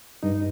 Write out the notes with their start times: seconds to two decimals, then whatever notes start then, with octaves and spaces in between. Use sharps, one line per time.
0.23 G2 D#4